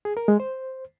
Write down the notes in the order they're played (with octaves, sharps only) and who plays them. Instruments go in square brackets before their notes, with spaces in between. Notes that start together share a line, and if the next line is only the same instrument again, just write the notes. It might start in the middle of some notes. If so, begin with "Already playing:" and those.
[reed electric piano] G#4
A#4
G#3
C5